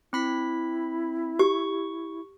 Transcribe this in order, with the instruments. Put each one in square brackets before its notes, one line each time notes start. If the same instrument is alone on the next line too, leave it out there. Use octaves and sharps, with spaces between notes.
[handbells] C4 B5 B6 [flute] E4
[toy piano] G4 [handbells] C#6